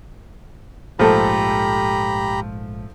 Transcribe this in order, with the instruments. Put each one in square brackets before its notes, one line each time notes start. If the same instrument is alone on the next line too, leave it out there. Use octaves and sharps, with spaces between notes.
[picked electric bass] A#1 G#2 [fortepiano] F3 A3 A4 [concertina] G4 A#5 B5